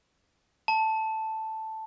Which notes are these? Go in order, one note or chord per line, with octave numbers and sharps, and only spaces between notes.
A5